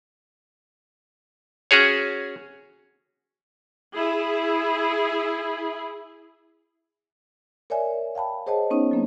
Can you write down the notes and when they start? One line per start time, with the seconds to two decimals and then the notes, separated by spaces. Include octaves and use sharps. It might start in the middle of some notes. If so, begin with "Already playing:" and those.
1.71 C#4 F#4 G#4 C#5
3.95 E4 G#4
7.70 A#4 C#5 D5 E5 G#5
8.15 F5 G5 A5 B5
8.46 G#4 C5 C#5 D#5 F#5 A5
8.70 B3 C#4 D#4 C#5
8.91 F#3 A#3 D4